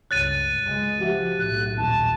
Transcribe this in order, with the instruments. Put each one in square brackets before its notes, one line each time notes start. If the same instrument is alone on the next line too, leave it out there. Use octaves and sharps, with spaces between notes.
[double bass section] C#2 G2 [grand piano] C#5 [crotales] F#6 A6 D#7
[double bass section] C#2 G#3
[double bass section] F3 [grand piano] F#4 G4 E5
[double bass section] B1 A2 [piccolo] F#6
[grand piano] D#1 [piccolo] A5